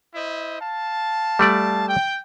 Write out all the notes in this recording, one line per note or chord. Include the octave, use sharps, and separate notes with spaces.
E4 C5 D#5
F5 A5
G3 A3 D5
G5